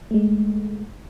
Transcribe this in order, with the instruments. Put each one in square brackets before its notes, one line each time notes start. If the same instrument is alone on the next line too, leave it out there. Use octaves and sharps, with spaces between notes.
[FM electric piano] G#3 A3